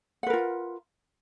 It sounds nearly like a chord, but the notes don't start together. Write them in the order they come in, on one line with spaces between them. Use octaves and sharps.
F#5 B4 A#4 F4